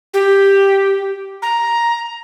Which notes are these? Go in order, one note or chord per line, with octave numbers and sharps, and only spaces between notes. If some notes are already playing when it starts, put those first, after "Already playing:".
G4
A#5